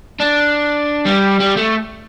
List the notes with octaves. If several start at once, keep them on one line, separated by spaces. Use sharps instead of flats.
D4
G3
G3
A3